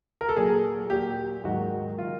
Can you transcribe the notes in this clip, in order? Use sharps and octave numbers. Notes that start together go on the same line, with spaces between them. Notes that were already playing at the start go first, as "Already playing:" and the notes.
A#4
A4
A#2 F#3 G#4
A#2 F#3 G4
G#2 D#3 F#3 F#4
D#3 F#3 F4